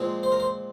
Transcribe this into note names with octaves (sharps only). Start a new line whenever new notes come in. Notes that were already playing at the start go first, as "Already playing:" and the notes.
Already playing: A#2 F3 G#3 C4
C5
A#4
C5